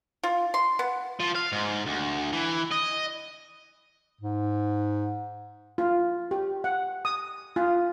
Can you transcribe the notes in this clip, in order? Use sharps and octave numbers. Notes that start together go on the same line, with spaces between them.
F4
C6
B3
F3
F5
G#2
D2
E3
D#5
G#2
F4
G4
F#5
D#6
F4